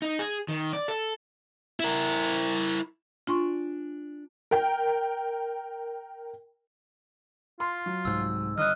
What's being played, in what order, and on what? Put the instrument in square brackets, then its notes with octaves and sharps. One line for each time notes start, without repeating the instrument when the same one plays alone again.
[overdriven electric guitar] D#4
G#4
D#3
D5
A4
[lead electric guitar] E4 A#4
[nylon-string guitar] D4 G#5 [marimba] F4 C6 C#6
[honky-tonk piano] A#4 G5
[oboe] F4 [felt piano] C6
[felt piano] F#3
[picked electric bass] C2 G#2 [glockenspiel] E6
[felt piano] G1 [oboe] D#5 [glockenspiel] F6 F#6